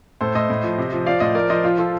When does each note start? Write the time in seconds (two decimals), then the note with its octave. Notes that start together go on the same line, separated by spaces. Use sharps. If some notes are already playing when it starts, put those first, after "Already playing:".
0.21 A2 A4 C5
0.35 A2 C5 D#5
0.50 A2
0.63 F3
0.78 C3
0.93 F3
1.06 F3 D5 F5
1.20 A2 C5 D#5
1.35 F3 A#4 D5
1.50 F3 C5 D#5
1.64 F3 F4
1.78 F3 F4 A4